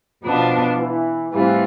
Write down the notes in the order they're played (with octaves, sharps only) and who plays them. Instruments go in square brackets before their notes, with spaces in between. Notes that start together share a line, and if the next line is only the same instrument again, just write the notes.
[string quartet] B2 B3 D4 F4 [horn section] F3
[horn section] E3
[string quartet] A2 G3 C4 F4 [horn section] E3